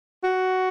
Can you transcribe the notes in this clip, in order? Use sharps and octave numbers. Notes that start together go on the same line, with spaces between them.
F#4